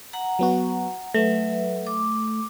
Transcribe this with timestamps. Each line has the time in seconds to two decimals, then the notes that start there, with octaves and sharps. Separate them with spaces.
0.13 F#5 A#5
0.39 F#3 B3 F#4
1.14 F#3 A3 B4 E5
1.87 D6